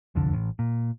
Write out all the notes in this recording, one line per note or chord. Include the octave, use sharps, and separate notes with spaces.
E1 C2 F2 D3
A1
A#2